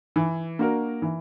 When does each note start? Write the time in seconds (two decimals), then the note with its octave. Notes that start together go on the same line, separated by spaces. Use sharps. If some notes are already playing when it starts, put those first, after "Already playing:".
0.16 E3
0.59 A#3 D4 F#4 A#4
1.02 E3